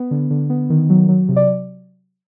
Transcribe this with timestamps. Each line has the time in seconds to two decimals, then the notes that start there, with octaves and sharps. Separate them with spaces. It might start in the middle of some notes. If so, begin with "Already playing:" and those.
Already playing: B3
0.11 D3
0.30 D3
0.50 B3
0.70 D#3
0.90 F#3
1.09 F#3
1.28 C3
1.36 D5